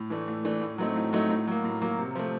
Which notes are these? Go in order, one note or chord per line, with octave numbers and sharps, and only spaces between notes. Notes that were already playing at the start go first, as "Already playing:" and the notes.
Already playing: A2
E3 A3 D4
A2
E3 A3 D4
A2
F#3 A3 C4 D#4
A2
F#3 A3 C4 D#4
A2
F#3 A#3
A2
F#3 A#3
C3
F3 A3